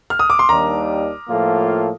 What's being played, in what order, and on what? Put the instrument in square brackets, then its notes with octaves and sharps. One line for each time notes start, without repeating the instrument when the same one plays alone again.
[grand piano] F6
D#6
D6
C6
[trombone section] D#2 D#3 G3 D4 [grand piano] A#5
[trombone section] A2 F3 A#3 F4 A4